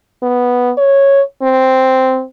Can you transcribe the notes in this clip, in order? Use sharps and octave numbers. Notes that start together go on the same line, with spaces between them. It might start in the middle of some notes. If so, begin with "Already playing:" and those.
B3
C#5
C4